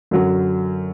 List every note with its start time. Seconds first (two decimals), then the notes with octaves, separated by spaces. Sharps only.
0.11 F#2 D3 F#3